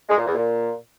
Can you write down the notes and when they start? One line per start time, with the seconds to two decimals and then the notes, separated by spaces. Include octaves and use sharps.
0.09 G#3
0.17 A#2
0.26 E2
0.35 A#2